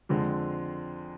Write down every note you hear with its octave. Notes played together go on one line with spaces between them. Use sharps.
F2 D3 G#3 C4